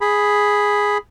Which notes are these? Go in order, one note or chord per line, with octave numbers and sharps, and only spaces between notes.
G#4 B5